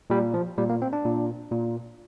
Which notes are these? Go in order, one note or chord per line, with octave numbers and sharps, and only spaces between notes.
A#2 G3
F3
A#2 G3
A#3
C4
D4
A#2
A#2